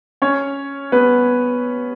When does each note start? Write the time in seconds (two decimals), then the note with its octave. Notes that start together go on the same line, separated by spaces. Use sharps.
0.22 C#4 C#5
0.92 B3 B4